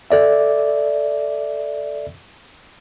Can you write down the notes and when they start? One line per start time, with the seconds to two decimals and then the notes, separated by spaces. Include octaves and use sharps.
0.11 A4 D5 E5